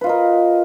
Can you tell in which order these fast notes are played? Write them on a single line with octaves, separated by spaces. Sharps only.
B4 F4 D#5 A#4